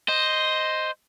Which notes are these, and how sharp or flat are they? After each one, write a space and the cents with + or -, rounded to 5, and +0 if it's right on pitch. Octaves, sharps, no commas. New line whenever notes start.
C5 +0 D#5 +0